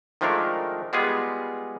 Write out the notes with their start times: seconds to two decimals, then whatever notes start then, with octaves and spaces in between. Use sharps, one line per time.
0.21 D#3 F3 G#3 A3 D4 A#4
0.93 G3 G#3 B3 F4 G#4